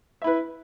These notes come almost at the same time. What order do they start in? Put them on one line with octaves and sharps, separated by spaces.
E5 E4 B4